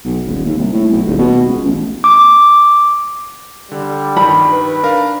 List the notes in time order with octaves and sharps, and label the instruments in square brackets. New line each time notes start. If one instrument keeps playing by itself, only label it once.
[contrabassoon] B1
D#1
D#2
C2
A2
B1
D#1
B2
C#2
A1
[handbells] D6
[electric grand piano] D3 [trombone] G3
[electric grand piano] G2 D#3 [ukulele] B5
[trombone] B4
[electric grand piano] D4 A#4 F5